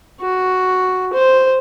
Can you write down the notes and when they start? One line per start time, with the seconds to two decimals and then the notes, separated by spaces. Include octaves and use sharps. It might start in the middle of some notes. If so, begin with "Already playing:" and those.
0.21 F#4
1.13 C5